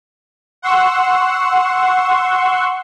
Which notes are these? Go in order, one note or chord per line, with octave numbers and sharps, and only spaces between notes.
F#5 C6 C#6 E6